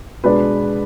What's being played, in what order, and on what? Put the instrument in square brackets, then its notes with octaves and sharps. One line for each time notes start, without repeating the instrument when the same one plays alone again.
[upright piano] B2 G#3 D4 B4